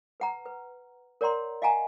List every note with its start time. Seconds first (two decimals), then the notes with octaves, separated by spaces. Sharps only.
0.20 B4 F#5 A#5
0.45 B4
1.21 A#4 C#5 D5 F#5 A#5 C6
1.62 D#5 F5 F#5 G#5 A#5